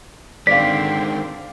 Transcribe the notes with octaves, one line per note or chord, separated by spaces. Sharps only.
D3 D#3 G#3 C4 D5 F5 B6